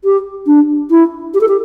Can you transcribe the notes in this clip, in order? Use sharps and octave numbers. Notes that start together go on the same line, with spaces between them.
G4
D4
E4
G4
A4
G4